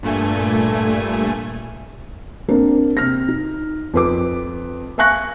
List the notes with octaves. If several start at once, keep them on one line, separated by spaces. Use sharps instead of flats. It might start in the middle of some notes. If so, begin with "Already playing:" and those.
G2 A#2 A3 G#5
A#3 C4 D4 A#4
C3 F6 A#6
D#4
F2 B4 D6
E5 F5 G#5 C#6 F#6 A#6